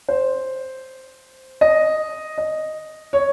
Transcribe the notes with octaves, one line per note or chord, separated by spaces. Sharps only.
C5
D#5
D#5
C#5